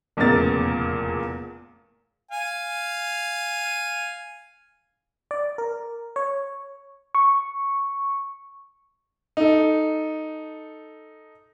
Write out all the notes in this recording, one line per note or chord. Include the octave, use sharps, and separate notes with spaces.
F1 E2 A#2 C#3 A#4 A6
F5 G#5
D5
A#4
C#5
C#6
D#4 A4